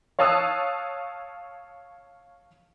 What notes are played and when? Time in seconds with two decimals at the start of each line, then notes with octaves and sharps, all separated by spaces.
0.19 C#5 F5 A5 D#6 E6 F#6